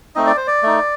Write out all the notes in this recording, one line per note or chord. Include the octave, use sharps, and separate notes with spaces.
A3 C4 D#4 D#5
D5
C5
D5
A3 D#4